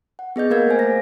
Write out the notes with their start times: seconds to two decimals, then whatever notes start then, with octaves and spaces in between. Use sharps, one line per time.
0.19 F#5
0.36 B3 G#4 D#5 G6
0.50 A#3 A#4 F5 G#6
0.67 A3 C5 G#5
0.79 A#6